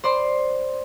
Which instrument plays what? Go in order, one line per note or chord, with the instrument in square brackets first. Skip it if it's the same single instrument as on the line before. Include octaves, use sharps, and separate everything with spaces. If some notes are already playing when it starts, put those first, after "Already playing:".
[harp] C5 D5 C6